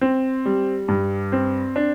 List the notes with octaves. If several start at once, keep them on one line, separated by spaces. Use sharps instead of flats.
C4
G3
G2
C4
D4